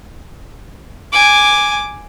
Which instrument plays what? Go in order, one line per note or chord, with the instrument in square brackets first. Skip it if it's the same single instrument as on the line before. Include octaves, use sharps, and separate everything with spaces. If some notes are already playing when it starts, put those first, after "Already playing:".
[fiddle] G#5 [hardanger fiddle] D6